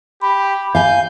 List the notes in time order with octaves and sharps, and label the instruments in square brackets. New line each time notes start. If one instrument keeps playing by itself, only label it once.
[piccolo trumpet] G4 [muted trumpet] B5
[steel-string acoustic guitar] F5 G#5 [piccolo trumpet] G6